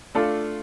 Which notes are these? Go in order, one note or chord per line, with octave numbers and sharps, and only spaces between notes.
A3 D4 F4 A4